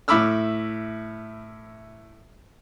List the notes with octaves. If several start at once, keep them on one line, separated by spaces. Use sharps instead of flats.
A2 E5 B5 D6 E6 F6